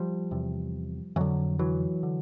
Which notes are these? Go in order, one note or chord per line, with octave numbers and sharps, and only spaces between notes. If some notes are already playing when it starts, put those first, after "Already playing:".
Already playing: F3 G3
E2 C3
F2 D3 E3 F#3
E3 F#3
D3